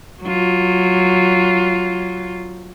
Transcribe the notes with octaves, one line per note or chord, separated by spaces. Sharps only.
F#3 F4